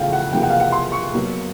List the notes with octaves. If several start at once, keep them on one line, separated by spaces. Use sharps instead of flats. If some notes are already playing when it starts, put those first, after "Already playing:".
Already playing: E2 C#3 F3 A3 F5 G5
F#5
E2 C3 F3 A#3 G5
F#5
F5
F#5
C6
C#6
B2 F#3 A#3